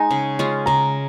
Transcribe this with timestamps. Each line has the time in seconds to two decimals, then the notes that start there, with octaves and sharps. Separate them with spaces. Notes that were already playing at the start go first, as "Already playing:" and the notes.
Already playing: G#3 D#4 G#5
0.11 C#3
0.39 G#3 C#4 F4
0.66 C#3 A#5